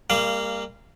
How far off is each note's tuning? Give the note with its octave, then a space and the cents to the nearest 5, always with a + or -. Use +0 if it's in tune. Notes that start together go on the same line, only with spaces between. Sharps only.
G3 +35 A#3 -10 F5 -20